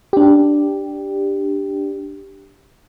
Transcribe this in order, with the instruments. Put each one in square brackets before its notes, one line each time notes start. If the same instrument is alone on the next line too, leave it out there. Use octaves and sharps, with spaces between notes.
[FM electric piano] D4 G4